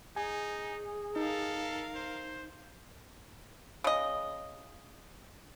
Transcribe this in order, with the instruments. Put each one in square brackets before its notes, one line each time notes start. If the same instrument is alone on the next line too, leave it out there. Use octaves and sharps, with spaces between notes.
[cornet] D#4 [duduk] G#4 [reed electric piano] G#5
[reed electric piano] D#4 [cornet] A4 [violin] A#4 F5
[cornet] C5
[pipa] C#3 D#5